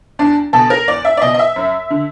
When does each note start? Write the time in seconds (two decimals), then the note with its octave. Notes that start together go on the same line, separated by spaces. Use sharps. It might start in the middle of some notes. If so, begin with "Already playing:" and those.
0.19 E2 D4
0.53 B2 A4
0.70 A#4
0.87 E2 D5
1.05 E5
1.17 D5
1.22 B2 D#5
1.34 D#5
1.39 E5
1.56 F#2
1.90 D3